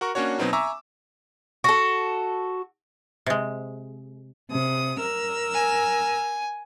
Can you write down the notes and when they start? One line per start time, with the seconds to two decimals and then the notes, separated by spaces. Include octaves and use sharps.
0.01 F#4 A#4 C#6
0.15 A#3 C#4 D4 F#4 C#5
0.39 B2 F#3 B3 C4 D#4
0.53 E5 G#5 A#5 C#6 D6 E6
1.64 F#4 A4
3.26 C3 G#3
4.51 C3 D#6
4.99 A#4 E6
5.54 G#5